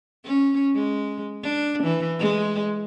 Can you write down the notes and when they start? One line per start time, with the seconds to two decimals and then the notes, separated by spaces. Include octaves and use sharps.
0.24 C#4
0.75 G#3
1.43 D4
1.83 E3
2.19 G#3